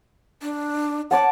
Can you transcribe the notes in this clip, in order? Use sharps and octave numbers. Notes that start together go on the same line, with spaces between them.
D4
C#5 F#5 A5 D6